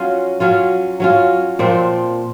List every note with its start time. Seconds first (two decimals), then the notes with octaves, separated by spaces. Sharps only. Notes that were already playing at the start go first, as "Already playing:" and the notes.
Already playing: F#3 C#4 F4
0.40 F#3 C#4 F4
1.00 F#3 C#4 F4
1.59 A#2 F3 C4